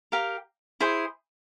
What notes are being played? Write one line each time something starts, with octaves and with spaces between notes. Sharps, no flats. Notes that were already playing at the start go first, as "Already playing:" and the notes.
G4 A#4 F5
E4 G#4 C5